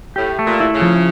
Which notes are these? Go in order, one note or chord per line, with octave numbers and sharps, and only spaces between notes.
A2 G4
A3
A#2
E4
C#3
F3